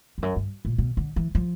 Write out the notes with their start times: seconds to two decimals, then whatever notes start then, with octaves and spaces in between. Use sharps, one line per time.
0.18 F2
0.22 F#2
0.36 G2
0.65 A#2
0.78 B2
0.97 D3
1.16 E3
1.35 F3